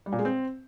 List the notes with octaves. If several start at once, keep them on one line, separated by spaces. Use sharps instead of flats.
G3
A#2
G#3
C4